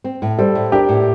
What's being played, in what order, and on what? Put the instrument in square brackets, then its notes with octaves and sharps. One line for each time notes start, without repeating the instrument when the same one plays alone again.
[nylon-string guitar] C4
A2
[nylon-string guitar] G3 [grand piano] A4 C5
[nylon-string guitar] A2
[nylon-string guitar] D4 [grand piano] G4 A#4
[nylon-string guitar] A2